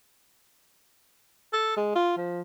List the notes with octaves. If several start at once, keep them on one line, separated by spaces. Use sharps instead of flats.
A4
G#3
F4
F3